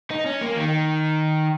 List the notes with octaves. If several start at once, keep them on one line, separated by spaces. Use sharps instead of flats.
D#4
C#4
A#3
D#3